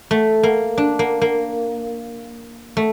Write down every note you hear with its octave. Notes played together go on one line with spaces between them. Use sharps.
A3
A#3
D4
A#3
A#3
A3